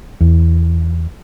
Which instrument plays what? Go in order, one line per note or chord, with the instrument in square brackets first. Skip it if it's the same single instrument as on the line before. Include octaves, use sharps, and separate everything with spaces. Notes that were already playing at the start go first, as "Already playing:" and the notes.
[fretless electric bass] E2